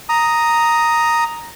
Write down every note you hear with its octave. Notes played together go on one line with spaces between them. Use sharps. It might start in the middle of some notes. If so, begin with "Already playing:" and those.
A#5 D#6